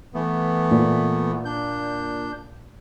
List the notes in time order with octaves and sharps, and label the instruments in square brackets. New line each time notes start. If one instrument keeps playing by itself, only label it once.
[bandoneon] E3 A3 B3
[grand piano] A#2
[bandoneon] D4 G6